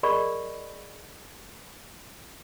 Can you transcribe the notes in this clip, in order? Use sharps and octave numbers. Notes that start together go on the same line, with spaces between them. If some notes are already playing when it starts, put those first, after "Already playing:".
G#4 A#4 D5 D#5 B5 C#6